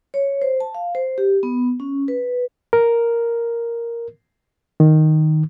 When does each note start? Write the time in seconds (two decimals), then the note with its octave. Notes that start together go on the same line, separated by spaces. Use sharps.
0.14 C#5
0.42 C5
0.60 A5
0.75 F5
0.95 C5
1.18 G4
1.43 B3
1.80 C#4
2.08 B4
2.73 A#4
4.80 D#3